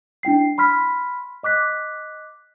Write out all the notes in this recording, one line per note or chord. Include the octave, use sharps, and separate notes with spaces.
D4 E4 G5 C7
B5 C6 F6 B6
D#5 D6 F#6 B6